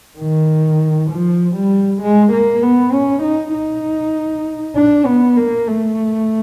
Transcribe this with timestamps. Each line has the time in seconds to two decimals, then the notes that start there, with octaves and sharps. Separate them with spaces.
0.19 D#3
1.11 F3
1.56 G3
2.02 G#3
2.32 A#3
2.62 B3
2.93 C#4
3.23 D#4
3.54 D#4
4.76 D4
5.06 B3
5.37 A#3
5.67 A3